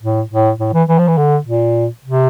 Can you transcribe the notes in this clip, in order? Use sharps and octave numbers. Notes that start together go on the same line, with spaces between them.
A2
A2
A2
E3
E3
F3
E3
D3
A#2
C3